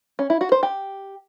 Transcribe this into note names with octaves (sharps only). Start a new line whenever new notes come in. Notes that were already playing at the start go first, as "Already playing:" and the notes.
C#4
E4
F#4
C5
G4